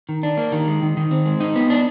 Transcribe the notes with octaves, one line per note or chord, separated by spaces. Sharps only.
D#3
D4
A#3
D#3
G#3
D#3
D#3
C4
G#3
D#4
B3
D4